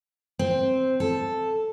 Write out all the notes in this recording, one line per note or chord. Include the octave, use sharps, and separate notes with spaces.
C4
A4